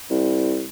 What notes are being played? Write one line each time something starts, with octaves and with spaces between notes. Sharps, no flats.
C2